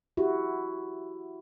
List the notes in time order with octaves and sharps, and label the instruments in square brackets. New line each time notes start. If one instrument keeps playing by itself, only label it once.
[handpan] E4 F#4 [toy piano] G4